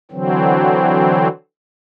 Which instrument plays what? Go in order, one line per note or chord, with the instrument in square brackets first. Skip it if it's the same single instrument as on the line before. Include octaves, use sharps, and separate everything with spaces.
[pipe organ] D3 E3 F#3 C4